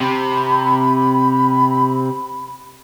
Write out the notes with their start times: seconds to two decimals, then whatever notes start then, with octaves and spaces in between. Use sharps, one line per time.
0.01 C3 B5